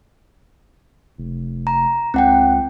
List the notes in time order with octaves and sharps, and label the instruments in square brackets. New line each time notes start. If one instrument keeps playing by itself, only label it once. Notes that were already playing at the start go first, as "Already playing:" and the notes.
[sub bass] F1
[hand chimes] A#5
[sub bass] C#2 [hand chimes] C4 F#5 G5